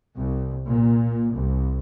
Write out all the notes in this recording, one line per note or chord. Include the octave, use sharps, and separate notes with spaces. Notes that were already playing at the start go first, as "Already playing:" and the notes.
C2
A#2
C2